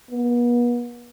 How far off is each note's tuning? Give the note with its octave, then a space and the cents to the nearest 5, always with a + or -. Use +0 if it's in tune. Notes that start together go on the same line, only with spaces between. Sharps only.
B3 -40